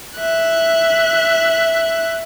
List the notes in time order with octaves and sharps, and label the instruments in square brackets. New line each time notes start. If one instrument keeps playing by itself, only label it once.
[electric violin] E5 F#6